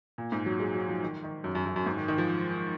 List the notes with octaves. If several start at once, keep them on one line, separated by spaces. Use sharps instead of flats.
A#2
G#2
F#3
G#3
F#3
F3
D#3
D#3
F#2
F#2
F#2
F#2
G#2
D#3
D#3
F3